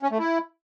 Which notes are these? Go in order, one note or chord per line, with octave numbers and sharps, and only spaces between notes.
C#4
A3
E4